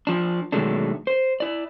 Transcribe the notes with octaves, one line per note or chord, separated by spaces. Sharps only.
F3 D4
B2 D#3 F#3 G#3 A3 D4
C5
E4 D5